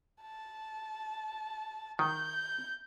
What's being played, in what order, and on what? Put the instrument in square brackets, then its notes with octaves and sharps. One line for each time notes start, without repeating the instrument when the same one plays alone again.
[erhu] A5
[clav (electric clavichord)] D#3 [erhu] G6